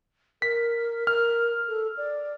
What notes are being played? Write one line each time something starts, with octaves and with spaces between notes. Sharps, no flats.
A#4 B6
A#4 F6
A4
D5